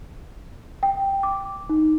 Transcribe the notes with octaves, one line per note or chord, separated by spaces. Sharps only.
G5
D6
D#4